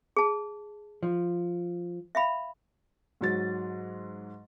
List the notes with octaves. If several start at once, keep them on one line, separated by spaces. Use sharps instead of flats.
G#4 A5
F3
E5 F5 B5
G#2 F#3 A6